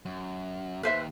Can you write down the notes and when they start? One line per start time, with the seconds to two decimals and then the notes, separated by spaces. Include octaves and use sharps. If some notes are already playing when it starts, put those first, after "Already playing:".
0.06 F#2
0.83 D#2 B4 C5 E5